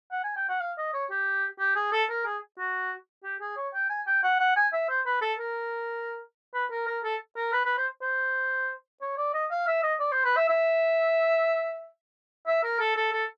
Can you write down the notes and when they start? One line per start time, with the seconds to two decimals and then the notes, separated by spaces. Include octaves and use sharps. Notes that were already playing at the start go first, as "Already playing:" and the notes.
0.11 F#5
0.24 G#5
0.36 G5
0.49 F#5
0.60 F5
0.78 D#5
0.94 C#5
1.10 G4
1.59 G4
1.75 G#4
1.92 A4
2.10 A#4
2.25 G#4
2.58 F#4
3.24 G4
3.40 G#4
3.57 C#5
3.74 G5
3.90 G#5
4.07 G5
4.23 F#5
4.39 F#5
4.56 G#5
4.73 E5
4.89 C5
5.06 B4
5.21 A4
5.39 A#4
6.54 B4
6.71 A#4
6.87 A#4
7.04 A4
7.36 A#4
7.52 B4
7.65 B4
7.77 C5
8.02 C5
9.01 C#5
9.17 D5
9.34 D#5
9.51 F5
9.67 E5
9.83 D#5
10.00 D5
10.12 C5
10.24 B4
10.36 E5
10.49 E5
12.47 E5
12.64 A#4
12.79 A4
12.96 A4
13.13 A4